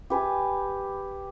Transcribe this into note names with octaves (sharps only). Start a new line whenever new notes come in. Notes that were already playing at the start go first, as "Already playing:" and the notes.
G4 B4 G#5